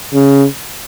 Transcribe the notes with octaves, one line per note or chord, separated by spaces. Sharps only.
C#3